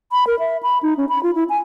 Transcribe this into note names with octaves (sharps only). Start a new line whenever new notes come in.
B5
A#4
E5
B5
D#4
C#4
B5
F4
E4
G#5